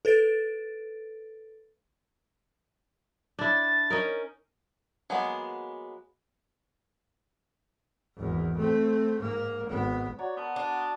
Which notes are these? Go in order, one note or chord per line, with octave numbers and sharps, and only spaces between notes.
A4 B4 A6 D7
D4 E4 A6
C#4 D#4 A#4
F#3 G#3 A#3 B3
G#1 E2
A3 C4
G#2 A#3
G#1 B3
F#4 C#5 D5 A#5
B3 A#4 A5
D4